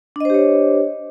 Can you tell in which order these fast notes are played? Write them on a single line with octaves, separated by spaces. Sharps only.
D4 D#5 C5 G4 C#5